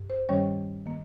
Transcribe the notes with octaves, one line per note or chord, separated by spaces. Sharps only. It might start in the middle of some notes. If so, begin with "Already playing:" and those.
Already playing: G2
C5
G2 D#3 G3 C#4 C#5
D#3 A#3